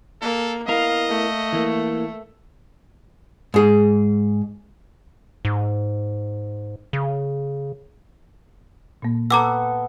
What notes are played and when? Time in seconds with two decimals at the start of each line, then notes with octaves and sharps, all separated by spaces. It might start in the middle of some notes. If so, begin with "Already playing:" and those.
0.22 A#3 A4
0.68 B3 E4 A#4 D#5 F5
1.09 A3
1.52 E3 A#3
3.54 G#2 G#4
5.45 G#2
6.93 C#3
9.02 A#2 A#3
9.31 B3 A4 G#5 A#5 D6 E6